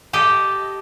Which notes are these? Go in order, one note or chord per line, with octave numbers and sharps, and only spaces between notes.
G4 A4 D#5